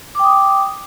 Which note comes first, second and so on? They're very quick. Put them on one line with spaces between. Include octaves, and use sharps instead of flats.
D6 G5 D#6